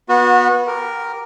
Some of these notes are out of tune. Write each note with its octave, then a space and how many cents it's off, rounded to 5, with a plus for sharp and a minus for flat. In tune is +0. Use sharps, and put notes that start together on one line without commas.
B3 -20 F#4 -30
G4 -5 A#4 +0